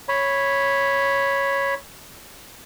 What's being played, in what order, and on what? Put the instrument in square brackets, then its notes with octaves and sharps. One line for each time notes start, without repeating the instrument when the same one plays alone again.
[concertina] C#5 B5